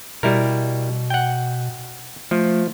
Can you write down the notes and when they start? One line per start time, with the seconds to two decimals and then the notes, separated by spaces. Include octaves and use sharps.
0.23 B2 G3 E4 A#4
1.10 F#5 G5
2.31 F3 A3